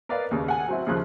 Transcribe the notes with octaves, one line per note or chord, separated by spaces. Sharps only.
A#4 B4 D5 D#5 F5
D#2 C#3
F#5 G#5
F#3 C4 E4
D#2 C#3 F3 F#6